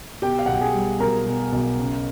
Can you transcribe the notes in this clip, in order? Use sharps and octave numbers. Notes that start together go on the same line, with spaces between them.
B2 G4 G5
F5
B1 F#5
G5
G#4 G#5
G3
B1 A#4 A#5
B2
B1
C#3